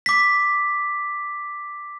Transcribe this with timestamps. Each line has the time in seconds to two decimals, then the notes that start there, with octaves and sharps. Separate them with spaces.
0.06 D6 B6